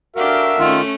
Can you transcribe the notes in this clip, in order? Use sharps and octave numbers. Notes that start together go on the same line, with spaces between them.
D4 F#4 G4 A4 A#4 E5 F5
D#3 A3 C#4 F4